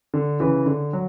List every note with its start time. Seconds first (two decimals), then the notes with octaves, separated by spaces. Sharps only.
0.14 D3
0.40 C#3 E3
0.66 D3
0.93 F#3